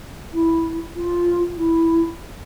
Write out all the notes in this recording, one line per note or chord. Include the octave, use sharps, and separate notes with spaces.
E4
F4
E4